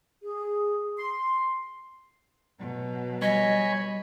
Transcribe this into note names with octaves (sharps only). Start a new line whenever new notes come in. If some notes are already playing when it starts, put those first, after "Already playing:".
G#4
C6
B2 F#3
G3 C#5 D#5 G#5 B5